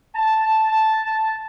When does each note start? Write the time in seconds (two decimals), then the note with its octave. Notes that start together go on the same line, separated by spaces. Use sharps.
0.16 A5